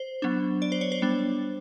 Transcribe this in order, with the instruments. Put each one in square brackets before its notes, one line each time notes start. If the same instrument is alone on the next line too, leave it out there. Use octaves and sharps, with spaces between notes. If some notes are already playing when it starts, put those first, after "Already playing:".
Already playing: [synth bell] C5
F#3 B3 D4
D5
C5
C#5
C5
G3 B3 D4